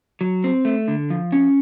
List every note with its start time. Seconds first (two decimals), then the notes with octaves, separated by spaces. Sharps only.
0.21 F#3
0.44 C4
0.65 A3
0.88 D3
1.10 F3
1.32 C#4